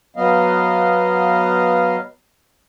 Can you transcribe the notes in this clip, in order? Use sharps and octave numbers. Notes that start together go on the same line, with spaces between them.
F#3 B3 D#5 F5